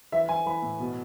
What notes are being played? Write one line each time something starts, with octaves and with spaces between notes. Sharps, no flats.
E3 E5
E3 G#5
E3 B5
A2
B2